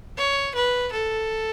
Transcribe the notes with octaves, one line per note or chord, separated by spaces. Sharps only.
C#5
B4
A4